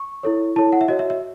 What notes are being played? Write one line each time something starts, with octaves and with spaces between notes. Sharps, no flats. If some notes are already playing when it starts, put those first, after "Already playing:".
Already playing: C#6
E4 A4 C#5
E4 A4 C#5 A5
F#5
E5
F#4 C#5 D#5
E5
E5